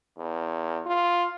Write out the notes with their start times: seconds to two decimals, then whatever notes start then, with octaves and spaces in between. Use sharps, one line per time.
0.17 E2
0.86 F4